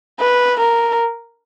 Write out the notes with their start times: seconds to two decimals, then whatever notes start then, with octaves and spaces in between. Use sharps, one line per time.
0.20 B4
0.60 A#4